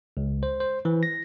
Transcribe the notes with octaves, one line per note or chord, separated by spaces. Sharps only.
C#2
C5
C5
E3
A#6